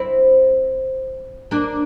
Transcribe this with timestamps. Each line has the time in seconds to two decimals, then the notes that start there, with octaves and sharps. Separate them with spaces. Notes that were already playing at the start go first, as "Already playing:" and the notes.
Already playing: C4 E4
1.51 A#3 D4